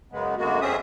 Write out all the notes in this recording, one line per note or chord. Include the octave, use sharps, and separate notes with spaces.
F#2 C#3 G#3 B3
F#2 D3 G#3 A#3 B3 F#4
F2 C4 C#4 G#4 E5 D#6